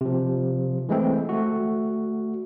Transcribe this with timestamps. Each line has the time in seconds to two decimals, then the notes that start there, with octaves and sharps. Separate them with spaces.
0.01 C3 F3
0.89 E3 G#3 A3 C4
1.29 A3 F#4